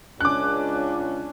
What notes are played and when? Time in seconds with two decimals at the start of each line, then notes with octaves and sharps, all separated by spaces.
0.21 C#2 C#4 D4 D6 F#6